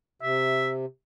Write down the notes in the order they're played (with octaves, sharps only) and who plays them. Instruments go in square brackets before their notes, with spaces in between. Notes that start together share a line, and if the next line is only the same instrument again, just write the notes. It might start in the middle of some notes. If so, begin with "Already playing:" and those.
[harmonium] C3 [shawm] E5